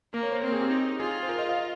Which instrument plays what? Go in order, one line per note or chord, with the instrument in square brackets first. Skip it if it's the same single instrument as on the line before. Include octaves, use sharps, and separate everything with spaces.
[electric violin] A#3 [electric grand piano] A#4
[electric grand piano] C#5
C5
[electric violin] C4 [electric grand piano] A#4
[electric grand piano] G#4
G4
[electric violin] D#4
[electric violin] F4 [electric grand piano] G#4
[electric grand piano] C5
A#4
D#5
F5
D#5